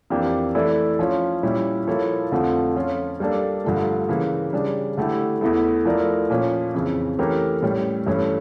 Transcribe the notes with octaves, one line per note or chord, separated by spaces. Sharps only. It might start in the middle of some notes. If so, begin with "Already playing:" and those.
F2 E3 A#3 D4 G4
E3 A3 E4 A4 D5
F3 C#4 F4
A#2 G3 C#4 E4
F3 A#3 E4 A4 C#5
F2 D3 F3 A3
F3 C#4 F4 A4
G3 A#3 D4 A4
G2 D3 F3 A3
C#3 E3 A#3
C#3 G3 D4
D3 A3 E4 G4
E2 E3 A3 E4
F3 A3 E4 A#4 D5
A#2 F3 C#4
F2 C#3 E3
E3 A3 C#4 G4 A#4
A2 G3 C#4
G2 E3 A3 C#4